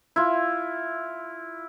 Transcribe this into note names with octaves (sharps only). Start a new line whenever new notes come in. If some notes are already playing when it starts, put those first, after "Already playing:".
E4 F4